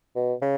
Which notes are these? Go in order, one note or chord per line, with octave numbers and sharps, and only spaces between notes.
B2
C#3